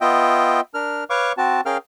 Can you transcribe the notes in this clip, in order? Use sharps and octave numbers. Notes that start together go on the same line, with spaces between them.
B3 F4 D#5 E5 G5
D4 A#4 F6
B4 C#5 F5 C#6 D6
C4 F#4 A5
C#4 G#4 A#4 F5 G5 F6